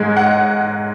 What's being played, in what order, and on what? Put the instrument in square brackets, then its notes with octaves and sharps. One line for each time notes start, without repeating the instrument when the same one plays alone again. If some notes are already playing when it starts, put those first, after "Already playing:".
Already playing: [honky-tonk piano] G#2 G#3
F#5